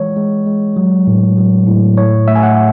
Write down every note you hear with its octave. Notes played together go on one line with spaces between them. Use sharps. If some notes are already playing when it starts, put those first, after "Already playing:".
Already playing: E3 G#3 C#5
G#3
G#3
F#3
A2
F#3
A2
A2 C#5
A3 E5
G#5
F#5